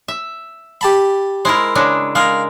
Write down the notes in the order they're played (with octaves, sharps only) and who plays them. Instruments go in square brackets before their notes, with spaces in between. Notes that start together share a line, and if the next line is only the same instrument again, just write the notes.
[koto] E5
[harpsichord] G4 A5 B5
[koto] G#3 E4 A#4 [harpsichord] C5
[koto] C#3 G#3 D4
[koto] G#3 A#4 [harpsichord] F5